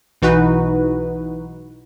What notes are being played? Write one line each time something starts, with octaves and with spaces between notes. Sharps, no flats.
B1 E3 D#4 F#4 B4